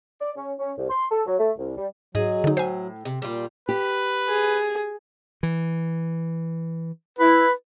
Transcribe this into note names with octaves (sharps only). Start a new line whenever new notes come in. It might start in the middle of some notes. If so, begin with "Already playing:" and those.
D5
C#4
C#4
C2
C6
A4
F#3
A3
C2
G3
G#2 F#3 G#4 D#5
D3 D#4
A2 C5 G#5
C3
A#2 G3 F4
G4 B4
G#4
E3
E4 B4